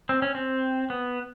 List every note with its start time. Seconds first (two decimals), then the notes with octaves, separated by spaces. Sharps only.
0.09 C4
0.22 C#4
0.35 C4
0.90 B3